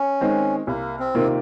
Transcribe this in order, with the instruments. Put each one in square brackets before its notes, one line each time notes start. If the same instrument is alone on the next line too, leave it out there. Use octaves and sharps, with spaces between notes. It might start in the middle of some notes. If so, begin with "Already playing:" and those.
Already playing: [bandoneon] C#4
[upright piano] D#3 G#3 C4
[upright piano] C2 [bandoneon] A#3
[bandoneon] C4
[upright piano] C3 D#3 A#3 F4